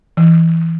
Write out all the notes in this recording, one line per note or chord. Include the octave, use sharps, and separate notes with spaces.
E3